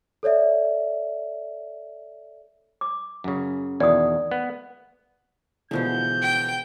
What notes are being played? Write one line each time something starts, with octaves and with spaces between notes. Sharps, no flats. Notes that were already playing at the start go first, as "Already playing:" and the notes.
A4 C#5 D5 E5
D6
F#2 C#3
E2 B2 D#3 D5 D#6
B3
B2 D3 E3 F3 G#3 G6
G5